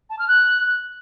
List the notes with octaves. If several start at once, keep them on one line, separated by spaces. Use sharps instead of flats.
A5
F6
F#6